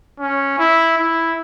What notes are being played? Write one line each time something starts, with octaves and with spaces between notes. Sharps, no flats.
C#4
E4
E4